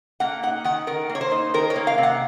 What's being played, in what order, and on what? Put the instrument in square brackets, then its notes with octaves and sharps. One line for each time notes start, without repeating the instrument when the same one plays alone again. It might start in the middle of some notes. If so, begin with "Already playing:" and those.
[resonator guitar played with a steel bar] A#3 F#5
D#4 F#5
D#3 F#5
D#3 A#4
A#3
C#5
C5
D#4
D#3 A#4
C#5
A#3
F5
C3
F#5